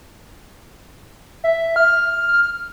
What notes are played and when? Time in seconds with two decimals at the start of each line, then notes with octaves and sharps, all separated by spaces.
1.44 E5
1.76 F6